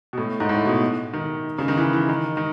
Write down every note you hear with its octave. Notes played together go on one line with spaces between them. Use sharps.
B2
A2
G#2
A2
B2
D#3
C#3
D#3
E3
E3
D#3
D#3